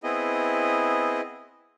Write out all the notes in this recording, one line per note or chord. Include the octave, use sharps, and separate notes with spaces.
B3 C4 E4 G#4 D#5